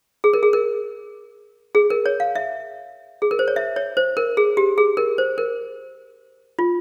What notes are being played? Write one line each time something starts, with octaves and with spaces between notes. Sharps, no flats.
G#4
A#4
G#4
A#4
G#4
A#4
C#5
F5
E5
G#4
A#4
C5
C#5
E5
C#5
C5
A#4
G#4
G4
G#4
A#4
C5
A#4
F4